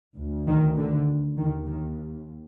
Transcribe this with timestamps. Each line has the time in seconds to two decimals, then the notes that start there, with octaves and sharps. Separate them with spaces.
0.17 D2
0.47 D#3
0.77 D3
1.37 D#2 D#3
1.66 D#3